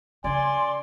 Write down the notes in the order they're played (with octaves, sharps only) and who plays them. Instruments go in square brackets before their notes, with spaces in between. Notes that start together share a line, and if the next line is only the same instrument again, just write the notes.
[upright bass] C#3 [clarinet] D5 [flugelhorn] G#5 [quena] C6